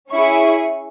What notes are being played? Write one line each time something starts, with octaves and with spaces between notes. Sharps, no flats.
C#4 E4 G#4 C#6